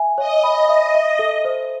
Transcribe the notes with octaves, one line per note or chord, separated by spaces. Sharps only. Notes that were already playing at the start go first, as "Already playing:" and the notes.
Already playing: E5 G#5
C#5 D#5
B5
E5
E5
A4
C5